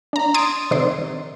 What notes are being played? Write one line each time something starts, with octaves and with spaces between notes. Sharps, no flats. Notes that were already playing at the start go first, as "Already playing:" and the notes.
D4 A#5
C6 D#6 G#6 A6 D7
C3 D#3 D4 C6